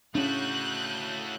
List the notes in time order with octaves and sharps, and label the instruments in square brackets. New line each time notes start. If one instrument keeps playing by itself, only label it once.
[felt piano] A2 C#3 [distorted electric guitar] A3 F#4 [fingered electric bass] C#4 D4 [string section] F#6 G6